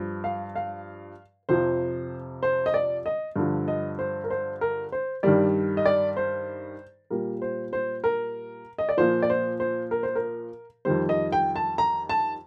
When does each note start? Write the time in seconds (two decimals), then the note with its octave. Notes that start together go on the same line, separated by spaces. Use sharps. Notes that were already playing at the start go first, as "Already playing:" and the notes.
Already playing: G2 F3
0.24 F5
0.56 F5
1.49 F2 C3 F3 C5
2.43 C5
2.66 D#5
2.74 D5
3.06 D#5
3.36 G2 D3 F3
3.68 D#5
3.99 C5
4.24 A#4
4.30 C5
4.61 A#4
4.92 C5
5.23 G2 D#3 G3 D5
5.77 D#5
5.86 D5
6.17 C5
7.10 A#2 G3 A#4
7.42 C5
7.73 C5
8.04 A#4
8.78 D#5
8.89 D5
8.97 A#2 F3 C5
9.22 D5
9.30 C5
9.60 C5
9.91 A#4
10.03 C5
10.15 A#4
10.85 F2 D#3 G3 C5
11.09 D#5
11.32 G5
11.56 A5
11.78 A#5
12.09 A5